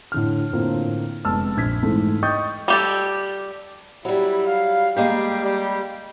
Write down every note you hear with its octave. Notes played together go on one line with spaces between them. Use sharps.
A2 D3 F6
A2 D3 A#3 C4 F4
F1 G#3 B3 A5 E6 F6
A#1 G#6 B6
G#2 E3 G#3 A3 E4
D#5 G5 C#6 D#6 G6 A6
G3 G4 A4
F#3 G3 E4
F5
G3 G#3 A#3 G4
G3